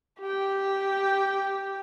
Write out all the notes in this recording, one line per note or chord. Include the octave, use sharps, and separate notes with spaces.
G4 G5